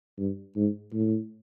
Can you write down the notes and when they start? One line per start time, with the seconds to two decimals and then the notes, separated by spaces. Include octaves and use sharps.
0.18 G2
0.56 G#2
0.93 A2